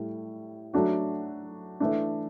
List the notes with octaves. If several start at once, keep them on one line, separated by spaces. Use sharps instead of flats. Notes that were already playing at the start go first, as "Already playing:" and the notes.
Already playing: A2 G3
F#3 A3 D4 F#4
E3 A3 D4